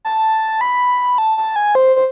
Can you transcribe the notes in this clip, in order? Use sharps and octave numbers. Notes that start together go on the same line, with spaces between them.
A5
B5
A5
A5
G#5
C5
C5